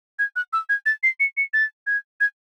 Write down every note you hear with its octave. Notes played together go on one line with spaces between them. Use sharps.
G#6
F#6
E6
G#6
A6
C7
C#7
C#7
A6
G#6
G#6